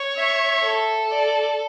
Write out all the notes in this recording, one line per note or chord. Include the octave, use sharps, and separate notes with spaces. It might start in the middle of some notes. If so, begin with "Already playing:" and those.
Already playing: C#5
E5
A4
D5